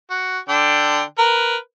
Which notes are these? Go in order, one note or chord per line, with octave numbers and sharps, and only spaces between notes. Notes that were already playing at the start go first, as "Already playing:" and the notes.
F#4
D3 D4 G5
A#4 B4